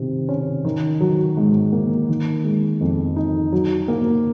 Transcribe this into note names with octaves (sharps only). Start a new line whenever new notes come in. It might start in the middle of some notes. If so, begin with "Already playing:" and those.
Already playing: C3 D#3
C#4
D#3
F#3
G#2
A#3
D#3
G#3
F2
D#4
F#3
A#3